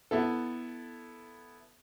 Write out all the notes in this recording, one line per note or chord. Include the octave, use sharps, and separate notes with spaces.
B3 E4 A4